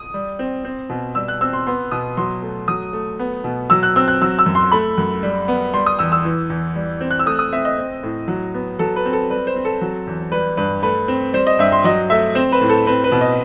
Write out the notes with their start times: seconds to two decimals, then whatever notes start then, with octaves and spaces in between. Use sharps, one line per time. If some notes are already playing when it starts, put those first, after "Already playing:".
Already playing: D#6
0.14 G3
0.39 C4
0.65 C4
0.89 B2
1.15 G3 E6
1.28 F#6
1.41 C4 E6
1.53 C6
1.67 B3 C6
1.91 B2 D#6
2.17 F#3 C6
2.43 A3
2.68 F#3 D#6
2.93 A3
3.19 B3
3.44 B2
3.70 F#3 E6
3.83 F#6
3.96 C4 E6
4.08 F#6
4.22 F#3 E6
4.39 E6
4.46 F#2
4.55 C6
4.72 A3 B5
4.98 F#2
5.23 G3
5.48 B3
5.74 G3 C6
5.86 D#6
5.99 E2 E6
6.12 E6
6.25 E3
6.50 E2
6.76 G3
7.01 C4
7.11 F#6
7.19 E6
7.26 A3 D#6
7.39 D#6
7.52 C4 E5
7.65 D#5
7.78 C4
8.03 A2
8.28 F#3
8.54 B3
8.79 F#3 A4
8.96 B4
9.05 C4
9.13 A4
9.30 G3 B4
9.47 C5
9.56 C4
9.65 A4
9.81 F#3
10.07 E2
10.32 G3 B4
10.57 G2 B4
10.83 A3 B4
11.08 C4
11.33 G3 C5
11.47 D#5
11.59 G2 E5
11.72 C6
11.84 F#3 D#5
12.10 A3 E5
12.35 C4 C5
12.52 B4
12.61 A2
12.69 A4
12.87 C4 B4
13.04 B4
13.12 B2
13.21 D#5